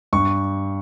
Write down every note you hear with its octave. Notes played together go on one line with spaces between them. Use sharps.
G2 C#6